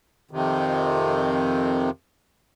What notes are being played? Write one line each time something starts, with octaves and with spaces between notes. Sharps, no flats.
F2 C3 D#3